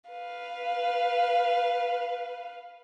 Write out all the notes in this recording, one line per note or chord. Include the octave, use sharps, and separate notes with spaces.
B4 F5